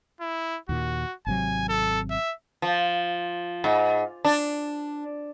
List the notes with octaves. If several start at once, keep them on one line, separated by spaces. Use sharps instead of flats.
E4
D#2 A#2 F#4
G#1 C3 F#3 G#5
A4
E5
F3
G#2
D4